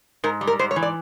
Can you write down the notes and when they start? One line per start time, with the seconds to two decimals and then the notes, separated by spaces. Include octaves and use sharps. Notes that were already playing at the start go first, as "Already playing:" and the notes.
0.24 G#2 A#4
0.41 G3
0.47 A#4
0.59 G#2 C5
0.71 C#5
0.76 E3
0.83 D5